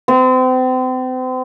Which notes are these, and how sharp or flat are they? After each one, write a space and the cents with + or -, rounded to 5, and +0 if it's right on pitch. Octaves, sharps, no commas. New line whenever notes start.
C4 -35